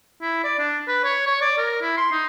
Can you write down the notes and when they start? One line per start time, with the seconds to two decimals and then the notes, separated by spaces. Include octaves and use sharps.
0.22 E4
0.44 D5
0.59 D4
0.88 B4
1.04 C#5
1.27 C#5
1.41 D5
1.58 A#4
1.82 E4
1.97 C6
2.12 D#4